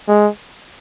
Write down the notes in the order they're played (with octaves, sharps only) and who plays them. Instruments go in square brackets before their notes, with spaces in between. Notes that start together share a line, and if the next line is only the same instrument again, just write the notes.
[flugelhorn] G#3